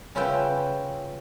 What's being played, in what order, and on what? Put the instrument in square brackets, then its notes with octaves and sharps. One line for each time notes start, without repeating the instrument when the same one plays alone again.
[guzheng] C#3 C#4 F4 B4 E5 G5